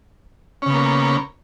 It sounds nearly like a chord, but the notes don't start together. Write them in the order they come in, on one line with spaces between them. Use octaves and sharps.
C#4 C#3 B3 A#3